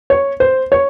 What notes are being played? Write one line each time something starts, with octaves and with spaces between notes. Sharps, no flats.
C#5
C5
C#5